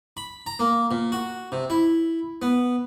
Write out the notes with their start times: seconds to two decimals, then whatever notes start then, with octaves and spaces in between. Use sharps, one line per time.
0.17 B5
0.46 A#5
0.59 A#3
0.91 A#2
1.12 F#4
1.52 C3
1.70 E4
2.42 B3